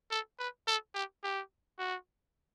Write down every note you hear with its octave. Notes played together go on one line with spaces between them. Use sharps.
A4
B4
A4
G4
G4
F#4